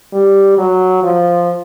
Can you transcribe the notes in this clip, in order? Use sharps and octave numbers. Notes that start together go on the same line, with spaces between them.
G3
F#3
F3